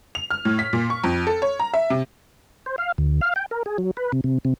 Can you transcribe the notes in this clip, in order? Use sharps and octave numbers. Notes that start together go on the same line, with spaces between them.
F7
F6
A2
B6
A#2
C#6
F2
A4
C#5
A#5
E5
C3
C5
F5
D2
F5
G5
A#4
G#4
F#3
B4
C3
C3
C3